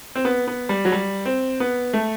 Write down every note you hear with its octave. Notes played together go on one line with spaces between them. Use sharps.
C4
B3
B3
G3
F#3
G3
C4
B3
A3